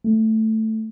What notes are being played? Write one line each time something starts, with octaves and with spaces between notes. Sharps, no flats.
A3